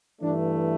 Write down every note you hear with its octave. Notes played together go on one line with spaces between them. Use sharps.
G2 E3 A3 D4